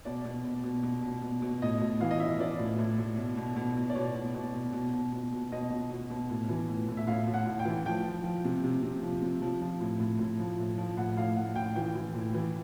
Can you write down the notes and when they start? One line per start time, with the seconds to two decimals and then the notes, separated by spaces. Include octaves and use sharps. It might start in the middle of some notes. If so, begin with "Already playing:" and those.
0.05 B2 D5
0.25 B2
0.44 B2
0.64 B2
0.83 B2
1.02 B2
1.22 B2
1.42 B2
1.62 A2 D#5
1.82 A2
2.01 E3 F5
2.11 D#5
2.20 E3 E5
2.40 E3 D5
2.59 A2
2.79 A2
2.99 A2
3.17 B2
3.38 B2
3.56 B2
3.77 B2
3.89 D5
3.95 B2 C#5
4.15 B2
4.35 B2
4.54 B2
4.73 B2
4.94 B2
5.12 B2
5.32 B2
5.52 B2 D#5
5.70 B2
5.90 B2
6.10 B2
6.30 A2
6.49 E3
6.68 A2
6.89 A2
6.97 E5
7.07 A2 F5
7.27 A2
7.34 F#5
7.46 A2
7.59 G5
7.65 E3
7.86 F3 G5
8.05 F3
8.24 F3
8.45 C3
8.64 C3
8.83 C3
9.03 F3
9.22 C3
9.42 F3
9.62 F3
9.81 A2
10.00 A2
10.19 A2
10.40 F3
10.59 A2
10.78 F3
10.97 A2 F#5
11.17 A2 F5
11.37 A2 F#5
11.56 A2 G5
11.76 E3 G5
11.95 E3
12.15 A2
12.34 E3